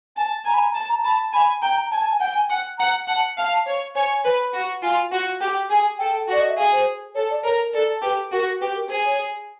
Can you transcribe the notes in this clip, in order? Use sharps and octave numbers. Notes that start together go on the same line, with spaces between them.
G#5 A5
G#5 A#5
B5
A#5
A5
A#5
A5 B5
G#5 B5
G5 A#5
A#5
G#5 A5
A5
G#5
F#5 G5
G#5
F#5
F#5 A#5
F#5 A5
F5 A5
C#5
C#5 G#5
B4
F#4
F4 G#5
F#4
G4 G5
G#4 G#5
A4 G5
F#4
D5
D#5
E5
G#4 F5
C5
A4 C#5
D5
A#4 C#5
A4 D5
G4 B4
F#4 A#4
G4 B4
A#4
G#4 C5
C#5